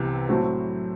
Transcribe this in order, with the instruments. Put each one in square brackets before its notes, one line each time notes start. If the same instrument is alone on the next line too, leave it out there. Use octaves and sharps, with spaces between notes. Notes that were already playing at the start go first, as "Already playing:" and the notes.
Already playing: [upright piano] C2 C3 E3 B3
A2 F#3 A3 C4